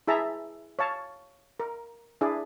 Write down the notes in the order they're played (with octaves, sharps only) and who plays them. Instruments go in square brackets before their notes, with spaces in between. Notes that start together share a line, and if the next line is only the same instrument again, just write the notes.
[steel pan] E4 G#4 E5 A5 A#5
C#5 F5 A5
A#4
D4 E4 G#4 D5